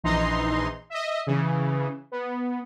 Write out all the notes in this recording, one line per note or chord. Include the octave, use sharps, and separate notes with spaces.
A#1 E3 D#4 A#5 C6
D#5 E5
C#3 E3 C#4
B3